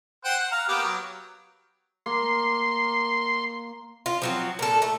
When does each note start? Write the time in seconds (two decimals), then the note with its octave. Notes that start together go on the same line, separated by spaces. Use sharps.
0.24 C5 F#5 G5
0.39 F#5
0.52 F5 A#5
0.68 A#3 B3 G4
0.84 F#3
2.06 A#3 C6
4.06 F4
4.22 F3 F#3 C4
4.59 A#2 A4
4.82 A3